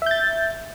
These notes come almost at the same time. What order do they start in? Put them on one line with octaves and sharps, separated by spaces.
E5 G6 A6